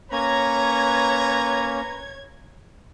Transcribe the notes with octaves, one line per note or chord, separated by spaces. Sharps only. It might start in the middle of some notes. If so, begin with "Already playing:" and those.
A#3 C#4 B4 C#5 A#5 G#6